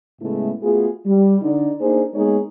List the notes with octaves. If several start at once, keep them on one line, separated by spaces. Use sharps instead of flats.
A2 C#3 G#3 A3 B3 E4
A3 B3 F4 F#4 G#4
G3
D3 D#4 D5
A#3 D4 D#4 G#4 A#4 C5
G#3 A#3 B3 D#4 G#4 C#5